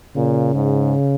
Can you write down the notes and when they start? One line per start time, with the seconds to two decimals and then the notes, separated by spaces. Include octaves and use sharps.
0.16 A#2 C#3
0.54 G#2